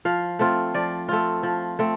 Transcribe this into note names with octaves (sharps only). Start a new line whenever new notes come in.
F3 F5
A3 C4 F4
F3 D5
A3 C4 F4
F3
A3 C4